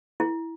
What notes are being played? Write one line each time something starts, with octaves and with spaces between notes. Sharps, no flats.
E4